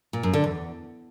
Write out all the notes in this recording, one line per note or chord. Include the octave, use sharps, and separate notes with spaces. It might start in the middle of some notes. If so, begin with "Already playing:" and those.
A#2
F#2
D3
E2